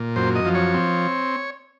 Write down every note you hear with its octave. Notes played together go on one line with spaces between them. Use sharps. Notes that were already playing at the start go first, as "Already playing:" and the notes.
Already playing: A#2
F#2 C5
D#5
F3
C#5
C4